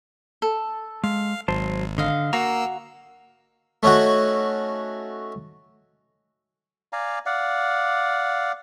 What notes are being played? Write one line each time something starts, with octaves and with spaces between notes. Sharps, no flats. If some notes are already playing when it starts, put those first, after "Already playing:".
A4
G#3 F5
G#1 F#3 C5 A5
D3 D#5 F5
A#3 F#4 F5 F#5 A#5 E6
A3 C#4 D#4 F#4
D5 F5 G#5 A#5
D5 F5 F#5